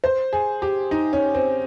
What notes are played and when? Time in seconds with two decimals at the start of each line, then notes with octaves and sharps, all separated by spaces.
0.04 C5
0.33 G#4
0.62 G4
0.91 D#4
1.13 C#4
1.35 C4